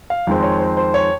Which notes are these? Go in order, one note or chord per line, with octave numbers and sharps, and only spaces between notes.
F5
F2 D#3 G#3 C4
C#5
C5
C5
C#5